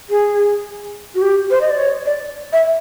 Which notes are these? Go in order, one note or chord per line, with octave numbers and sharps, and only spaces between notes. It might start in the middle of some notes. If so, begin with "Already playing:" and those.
G#4
F#4
G4
C5
D#5
D5
C#5
D5
E5